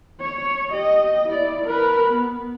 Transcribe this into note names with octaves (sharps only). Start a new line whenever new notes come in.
C#5
G4 D#5
E4 D5
A#4 B4
B3